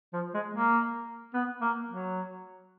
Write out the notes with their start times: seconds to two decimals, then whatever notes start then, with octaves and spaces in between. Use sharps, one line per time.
0.13 F3
0.34 G#3
0.54 A#3
1.34 B3
1.61 A#3
1.88 F#3